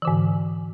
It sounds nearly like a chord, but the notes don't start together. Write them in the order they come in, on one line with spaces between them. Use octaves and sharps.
E3 D3 G#2